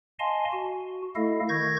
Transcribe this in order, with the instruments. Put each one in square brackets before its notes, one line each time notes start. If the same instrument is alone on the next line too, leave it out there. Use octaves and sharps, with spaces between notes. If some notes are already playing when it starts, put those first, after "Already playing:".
[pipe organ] D#5 F5 G#5 A5 C6
F#4
A3 E4 A4 D#5 F5
D#3 C#6 G6 G#6 A#6